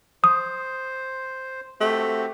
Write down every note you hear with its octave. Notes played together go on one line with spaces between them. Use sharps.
C5 D#6
A3 C4 F#4 G4